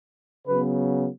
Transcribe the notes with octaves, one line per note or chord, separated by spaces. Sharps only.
C#3 F#3 B3 B4